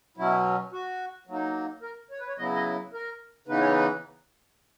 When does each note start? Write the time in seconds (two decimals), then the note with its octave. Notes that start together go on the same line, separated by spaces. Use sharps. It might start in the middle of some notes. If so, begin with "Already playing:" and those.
0.17 B2 F#3 C#4 E4
0.72 F#4
1.27 F#3 A#3 D#4
1.82 A#4
2.11 C#5
2.19 B4
2.28 C#5
2.38 C#3 F#3 B3 E4 D#5
2.56 D#5
2.93 A#4
3.47 C#3 E3 B3 D#4 B4
3.60 C#5
3.71 B4